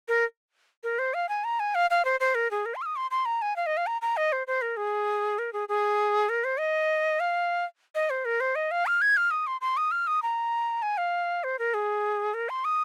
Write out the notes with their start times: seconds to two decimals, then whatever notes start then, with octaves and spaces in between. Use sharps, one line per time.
0.08 A#4
0.84 A#4
0.99 C5
1.14 F5
1.29 G#5
1.44 A#5
1.60 G#5
1.75 F5
1.90 F5
2.05 C5
2.20 C5
2.35 A#4
2.51 G#4
2.66 A#4
2.75 C6
2.82 F6
2.86 D#6
2.96 C6
3.11 C6
3.25 A#5
3.42 G#5
3.56 F5
3.66 D#5
3.77 F5
3.87 A#5
4.02 A#5
4.17 D#5
4.32 C5
4.47 C5
4.62 A#4
4.77 G#4
5.39 A#4
5.53 G#4
5.69 G#4
6.29 A#4
6.44 C5
6.59 D#5
7.20 F5
7.95 D#5
8.10 C5
8.25 A#4
8.40 C5
8.55 D#5
8.71 F5
8.86 F6
9.02 G#6
9.17 F6
9.31 D#6
9.47 C6
9.61 C6
9.77 D#6
9.91 F6
10.07 D#6
10.23 A#5
10.82 G#5
10.98 F5
11.44 C5
11.59 A#4
11.74 G#4
12.34 A#4
12.49 C6
12.65 D#6